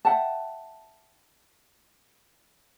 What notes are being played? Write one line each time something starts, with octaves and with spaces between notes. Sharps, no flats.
E5 F#5 G5 A5